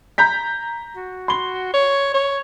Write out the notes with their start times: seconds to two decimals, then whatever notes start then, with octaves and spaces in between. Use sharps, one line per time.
0.18 A#5 G6 B6
0.96 F#4
1.28 C6 G7
1.74 C#5
2.14 C#5